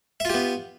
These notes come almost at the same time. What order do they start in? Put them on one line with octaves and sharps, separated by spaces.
E5 F4 G4 B3